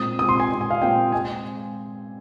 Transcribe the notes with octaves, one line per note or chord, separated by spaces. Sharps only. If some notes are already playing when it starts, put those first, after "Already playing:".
Already playing: A#2 G#3 C4 D#6
A#2 G#3 C4 D#6
C6
G#5
A#2 G#3 C4
G#5
F5
A#2 G#3 C4 G5
G#3 C4 G#5